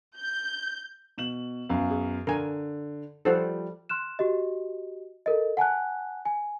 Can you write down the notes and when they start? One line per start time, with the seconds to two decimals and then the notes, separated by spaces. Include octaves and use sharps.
0.18 G6
1.18 B2 E7 F#7
1.69 F#2 B3 F5
1.91 G#4
2.27 D3 A#4 G#5
3.25 F3 G3 A4 C5 F#5
3.89 C6 F6 F#6 E7
4.19 F#4 G4 D#5
5.26 A4 A#4 D#5
5.57 F#5 G#5 A5 F#6
6.25 G#5